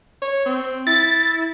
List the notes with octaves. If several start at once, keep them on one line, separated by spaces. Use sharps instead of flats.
C#5
C4
E4 A6